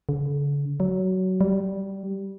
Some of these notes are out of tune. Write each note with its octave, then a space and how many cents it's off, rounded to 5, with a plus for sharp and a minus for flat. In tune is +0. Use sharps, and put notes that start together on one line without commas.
D3 -45
F#3 +15
G3 -10